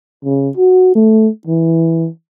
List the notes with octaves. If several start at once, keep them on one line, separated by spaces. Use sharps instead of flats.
C#3
F#4
A3
E3